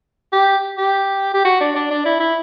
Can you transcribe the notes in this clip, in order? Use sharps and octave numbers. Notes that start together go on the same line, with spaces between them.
G4
G4
G4
F#4
D4
D4
D4
E4
E4